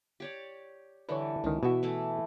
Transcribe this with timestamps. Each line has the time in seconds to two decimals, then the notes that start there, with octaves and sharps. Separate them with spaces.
0.20 G4 C#5 D5
1.09 D3 E3 G3 B4 C#5
1.44 C#2 D#3 E3
1.63 B2 E3 F#4 E5
1.83 E3 A3 E4